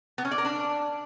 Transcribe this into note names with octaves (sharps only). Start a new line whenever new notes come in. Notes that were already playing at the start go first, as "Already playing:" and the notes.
B3
C#4
D5
A#4
D4